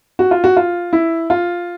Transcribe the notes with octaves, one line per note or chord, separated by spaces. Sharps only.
F#4
F4
F#4
F4
E4
F4